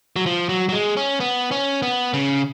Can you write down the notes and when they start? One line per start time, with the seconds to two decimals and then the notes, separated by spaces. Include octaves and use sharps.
0.16 F#3
0.26 F3
0.49 F#3
0.69 F#3
0.72 G#3
0.97 C#4
1.20 B3
1.51 C#4
1.82 B3
2.14 C#3